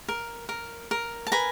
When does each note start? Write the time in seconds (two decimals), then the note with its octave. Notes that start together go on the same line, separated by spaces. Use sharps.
0.08 A#4
0.49 A#4
0.91 A#4
1.27 A5
1.32 B4 G#5 A#5